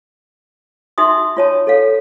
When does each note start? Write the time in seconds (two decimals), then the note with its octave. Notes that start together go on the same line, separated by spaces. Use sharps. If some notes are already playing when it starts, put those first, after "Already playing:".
0.98 D#4 F#4 E5 C6 D#6
1.37 F4 C#5 A5
1.67 A4 C#5 F5